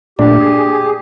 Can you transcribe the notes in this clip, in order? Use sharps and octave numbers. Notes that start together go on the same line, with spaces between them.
A#2 A3 D4 G4
G#4